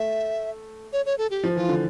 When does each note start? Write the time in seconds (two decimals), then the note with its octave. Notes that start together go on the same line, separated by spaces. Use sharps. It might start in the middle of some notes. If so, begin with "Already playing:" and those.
Already playing: A3 E5
0.93 C#5
1.06 C#5
1.18 A4
1.31 G4
1.43 F3
1.56 E3 F4
1.69 D3